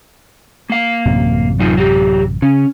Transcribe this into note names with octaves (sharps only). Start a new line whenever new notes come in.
A#3 F5
A1 F#2 C3
F#3 D#4 F4
F#3 G4
C#3 C#4